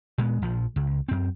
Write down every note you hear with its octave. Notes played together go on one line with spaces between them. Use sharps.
A#2 G#3 B3
A#1 F3
C#2
F#2 C4